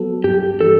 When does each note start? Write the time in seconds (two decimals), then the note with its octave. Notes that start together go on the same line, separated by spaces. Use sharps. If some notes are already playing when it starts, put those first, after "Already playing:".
Already playing: F#3 B3 F#4 A4
0.24 G2 G4
0.61 E3 G3 D4 A4